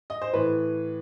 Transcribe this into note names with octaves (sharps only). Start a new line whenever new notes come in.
D#5
C5
A2 E3 B4